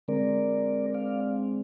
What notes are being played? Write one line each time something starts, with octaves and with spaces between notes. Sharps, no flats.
D3 G#3 C4 A#4 D5
D5 F5